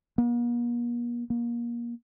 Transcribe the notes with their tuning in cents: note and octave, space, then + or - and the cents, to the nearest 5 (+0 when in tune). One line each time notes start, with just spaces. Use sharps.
A#3 +45
A#3 +25